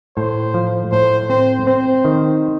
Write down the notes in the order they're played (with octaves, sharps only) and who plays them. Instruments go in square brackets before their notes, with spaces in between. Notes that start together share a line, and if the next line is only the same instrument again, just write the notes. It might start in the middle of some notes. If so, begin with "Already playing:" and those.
[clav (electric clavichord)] A2 [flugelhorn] C5
[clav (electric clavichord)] F3
[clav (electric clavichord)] A2 [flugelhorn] C5
[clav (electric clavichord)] C4 [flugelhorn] C5
[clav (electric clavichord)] C4 [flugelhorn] C5
[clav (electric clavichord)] D#3